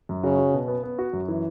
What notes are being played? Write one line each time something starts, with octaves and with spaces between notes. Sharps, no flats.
F#2
C#3 F#4
F#4
B2
B3
B3
F#4
F#2
E3